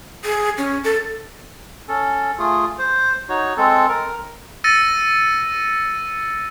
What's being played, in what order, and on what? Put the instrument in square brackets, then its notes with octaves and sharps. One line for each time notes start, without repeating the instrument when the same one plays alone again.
[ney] G#4
C#4
A4
[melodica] C#4 A4
A3 F4 G#4
C5
D#4 F#4 C#5
G#3 C4 A4
A#4
[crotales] E6 A6 A#6 C#7 D#7